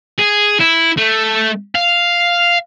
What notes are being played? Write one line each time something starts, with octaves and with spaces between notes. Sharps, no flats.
G#4
E4
A3
F5